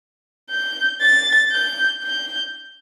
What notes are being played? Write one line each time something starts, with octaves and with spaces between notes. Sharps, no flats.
G6
A6
G6
G6